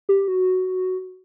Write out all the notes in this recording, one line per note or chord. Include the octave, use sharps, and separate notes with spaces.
G4
F#4